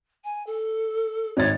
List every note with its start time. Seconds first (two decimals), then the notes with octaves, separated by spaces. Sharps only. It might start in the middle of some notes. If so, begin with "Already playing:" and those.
0.24 G#5
0.47 A4
1.37 G#1 C#5 A6